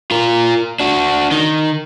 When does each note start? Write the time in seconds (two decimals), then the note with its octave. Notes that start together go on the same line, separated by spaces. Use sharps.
0.11 F4 A#4
0.80 D4 F#4
1.31 D#3